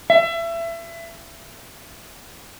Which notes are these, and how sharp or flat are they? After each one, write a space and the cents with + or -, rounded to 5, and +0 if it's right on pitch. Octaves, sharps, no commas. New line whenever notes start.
E5 +30